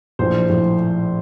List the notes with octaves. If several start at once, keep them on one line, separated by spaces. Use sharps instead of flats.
A#1 A2 F3 C5
A2 F3